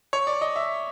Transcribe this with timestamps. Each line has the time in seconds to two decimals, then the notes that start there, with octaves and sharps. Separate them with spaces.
0.13 C#5
0.27 D5
0.42 D#5
0.56 E5